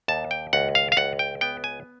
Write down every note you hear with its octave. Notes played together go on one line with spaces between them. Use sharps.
D#2 A5
G5
C#2 F#5
F5
F5
C#2 F#5
G5
B3 G5
G#5